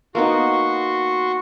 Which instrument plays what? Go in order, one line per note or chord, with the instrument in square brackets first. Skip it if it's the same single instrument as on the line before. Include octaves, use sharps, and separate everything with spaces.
[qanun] A#3 B3 D#4 [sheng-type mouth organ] F#4 C6 C#6